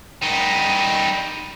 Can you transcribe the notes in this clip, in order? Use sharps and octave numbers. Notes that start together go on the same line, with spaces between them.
G3 D#4